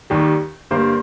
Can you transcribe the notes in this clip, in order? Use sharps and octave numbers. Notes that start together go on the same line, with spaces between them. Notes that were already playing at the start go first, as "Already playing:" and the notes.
D#2 D#3 G3
G2 D3 G3 A#3 C5